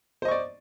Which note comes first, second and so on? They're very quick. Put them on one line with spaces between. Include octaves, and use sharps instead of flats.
C5 D#5 C#6 D5